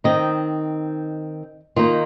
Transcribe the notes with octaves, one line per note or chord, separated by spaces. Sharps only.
D#3 C4 D#4 D#5
D#3 A#3 D#4 F4